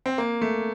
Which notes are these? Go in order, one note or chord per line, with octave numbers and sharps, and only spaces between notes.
C4
A#3
A3